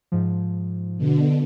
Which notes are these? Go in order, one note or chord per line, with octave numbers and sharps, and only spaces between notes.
G#2 F3
B2 D3